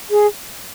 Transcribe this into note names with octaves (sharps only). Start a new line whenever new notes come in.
G#4